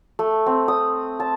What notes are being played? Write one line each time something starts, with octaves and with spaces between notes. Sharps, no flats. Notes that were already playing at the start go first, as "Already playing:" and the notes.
A3
C4
D#6
A5